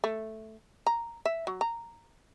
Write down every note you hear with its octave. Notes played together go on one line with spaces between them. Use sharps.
A3
A#5
E5
F#3
A#5